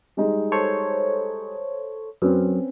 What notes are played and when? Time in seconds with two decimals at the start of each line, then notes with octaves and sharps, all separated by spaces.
0.17 G3 G#3 D#4
0.52 A4 C5 C#5
2.22 F#2 C4 C#4 B4